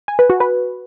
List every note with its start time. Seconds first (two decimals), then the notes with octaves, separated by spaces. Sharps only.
0.08 G#5
0.19 B4
0.30 F#4
0.40 B4